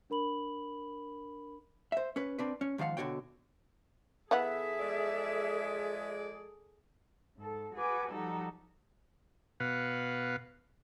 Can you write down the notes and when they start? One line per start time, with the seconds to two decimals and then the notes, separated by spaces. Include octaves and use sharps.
0.10 D4 A#4 B5 F#7
1.92 C5 E5
2.16 C#4 B4
2.39 C4 D4 B4
2.61 C#4
2.78 G#2 D#3 F3 F5 F#5
2.97 B2 D3 F#4 C#5 G5
4.31 E3 B3 G#4 A4 E5 F#5
4.79 F3 G#3 D5
7.37 G#2 A4
7.75 F#4 G#4 B4 G#5 D6
8.10 F3 G3 D#4 F#4 A4
9.60 B2 B4 F5 F#5